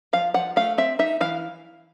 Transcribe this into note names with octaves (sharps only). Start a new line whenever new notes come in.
F3 F5
F3 F#5
A3 F5
C4 E5
D#4 E5
E3 F5